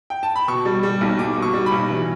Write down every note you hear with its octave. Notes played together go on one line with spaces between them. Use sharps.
G5
A5
B5
B2 C#6
G3
G3
B1
B1 D6
B2
C#6
G3
B5
B1
E3